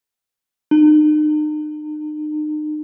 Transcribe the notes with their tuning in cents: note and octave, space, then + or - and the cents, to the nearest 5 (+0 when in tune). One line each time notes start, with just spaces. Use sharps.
D#4 -40